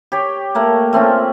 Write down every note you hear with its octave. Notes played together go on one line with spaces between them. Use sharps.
G4 C#5
A3 A#3 C#5
A3 C4 C#4 F4